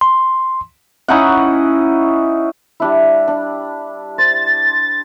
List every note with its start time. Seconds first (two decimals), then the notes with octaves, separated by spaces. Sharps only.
0.01 C6
1.08 C#4 D#4 E4 F#5
2.80 G3 D4 E4
3.28 D4
4.18 C5 A6